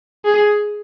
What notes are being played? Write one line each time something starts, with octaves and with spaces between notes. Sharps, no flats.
G#4